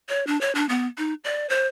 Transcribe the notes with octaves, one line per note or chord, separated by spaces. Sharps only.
C#5
D4
C#5
D4
B3
D#4
D5
C5